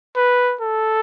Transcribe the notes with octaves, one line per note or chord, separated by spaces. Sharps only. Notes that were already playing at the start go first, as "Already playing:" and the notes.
B4
A4